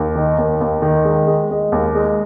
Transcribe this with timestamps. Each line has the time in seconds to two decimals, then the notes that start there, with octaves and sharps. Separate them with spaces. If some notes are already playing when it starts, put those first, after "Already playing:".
Already playing: D#2
0.15 D#3
0.38 D#2
0.61 D#2
0.82 D#3
1.05 G#3
1.27 G#3
1.51 G#3
1.72 D#2
1.95 G#3